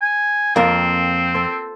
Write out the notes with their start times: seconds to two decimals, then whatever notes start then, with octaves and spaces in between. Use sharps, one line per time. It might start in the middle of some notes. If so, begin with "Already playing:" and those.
0.02 G#5
0.56 F2 A#3 C4 F4 A#4
1.34 A4 C5